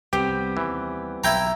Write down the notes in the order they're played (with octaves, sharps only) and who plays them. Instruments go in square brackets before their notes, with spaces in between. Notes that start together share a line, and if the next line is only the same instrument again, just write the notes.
[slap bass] C2 [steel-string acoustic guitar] G3 B3 C4 [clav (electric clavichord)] G4
[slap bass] D#2 [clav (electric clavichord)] E3
[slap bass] B1 [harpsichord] E4 G5 A#5